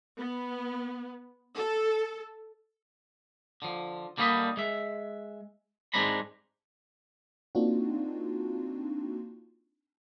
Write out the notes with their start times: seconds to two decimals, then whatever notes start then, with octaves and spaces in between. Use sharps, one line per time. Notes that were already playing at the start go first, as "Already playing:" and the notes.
0.17 B3
1.56 A4
3.62 D3 F3
4.18 D3 G3 A#3 C5 D#5 B5
4.57 G#3 E5
5.94 G#2 G#3 C4 D4 A#5 B5
7.55 A#3 C4 D4 D#4 F4 F#4